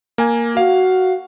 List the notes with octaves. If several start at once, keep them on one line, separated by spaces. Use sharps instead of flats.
A#3 G#5
F#4 F5